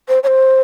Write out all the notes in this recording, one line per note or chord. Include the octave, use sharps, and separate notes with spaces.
C5
C#5
C5